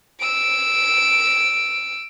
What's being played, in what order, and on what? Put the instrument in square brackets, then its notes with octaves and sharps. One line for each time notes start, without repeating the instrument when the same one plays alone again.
[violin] E6 D7